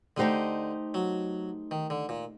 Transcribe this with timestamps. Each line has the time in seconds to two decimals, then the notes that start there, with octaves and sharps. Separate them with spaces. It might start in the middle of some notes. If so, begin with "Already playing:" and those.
0.17 D3 A3 D#4 G4 C5 D#5
0.94 F#3
1.71 D#3
1.90 D3
2.09 A#2